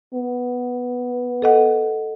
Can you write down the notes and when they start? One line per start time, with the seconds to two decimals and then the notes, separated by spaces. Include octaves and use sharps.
0.13 B3
1.42 A4 D#5 F#5